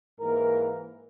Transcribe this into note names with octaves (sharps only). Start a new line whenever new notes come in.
G#2 E3 A#3 A#4